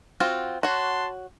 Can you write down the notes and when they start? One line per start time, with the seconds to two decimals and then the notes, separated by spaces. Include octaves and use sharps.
0.20 C4 F4 F#4
0.63 F#4 C#5 F#5 A5 C6